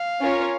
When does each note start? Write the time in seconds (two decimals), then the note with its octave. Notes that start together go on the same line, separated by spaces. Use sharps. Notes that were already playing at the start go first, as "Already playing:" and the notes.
Already playing: F5
0.20 C#4 F4 A#4 C#5